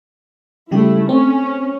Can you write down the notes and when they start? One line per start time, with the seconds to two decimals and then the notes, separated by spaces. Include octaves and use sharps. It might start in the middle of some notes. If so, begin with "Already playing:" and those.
0.71 C#3 G3 A3 E4 G4
1.09 C4 C#4